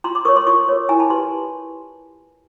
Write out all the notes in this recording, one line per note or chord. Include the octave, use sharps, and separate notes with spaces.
F4 A#5 C6
C6 D6
A#4 C#5 C#6 D#6
C6 D6
F4 C#6 D#6
A#4 C#5
E4 G#5 A#5
A5 B5
G4 B4 A#5 C6